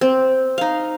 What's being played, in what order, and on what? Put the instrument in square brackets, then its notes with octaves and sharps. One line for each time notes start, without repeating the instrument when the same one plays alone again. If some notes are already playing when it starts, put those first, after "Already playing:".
[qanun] C4
D#4 F5